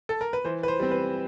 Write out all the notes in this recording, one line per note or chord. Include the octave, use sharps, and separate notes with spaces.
A4
A#4
B4
E3 C5
B4
C5
G3 C4
B4